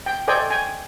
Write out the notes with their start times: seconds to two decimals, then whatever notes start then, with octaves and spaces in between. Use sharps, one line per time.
0.06 G5
0.28 A4 C5 D5 D#5 G5 G#5
0.50 G5 G#5